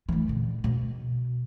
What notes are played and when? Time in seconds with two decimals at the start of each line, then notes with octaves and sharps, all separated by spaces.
0.09 E3 A3
0.28 A#2 D3
0.64 B2